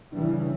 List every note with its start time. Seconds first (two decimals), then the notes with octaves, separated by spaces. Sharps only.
0.12 C#3 E3 G3 D4
0.21 E4
0.32 D4
0.41 C#4